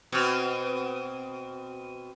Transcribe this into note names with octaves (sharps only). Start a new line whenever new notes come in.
B2 C4